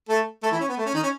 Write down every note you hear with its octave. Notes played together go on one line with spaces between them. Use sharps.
A3 A4
A3 A4
E3 E4
C#4
B3
A3
C#4
D#3 D#4
C#4